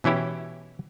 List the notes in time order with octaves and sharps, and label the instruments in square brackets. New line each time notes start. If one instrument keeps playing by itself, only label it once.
[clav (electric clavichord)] B2 E3 C#4 E4 G4